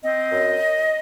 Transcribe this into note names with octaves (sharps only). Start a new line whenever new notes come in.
C4 D#5
F#2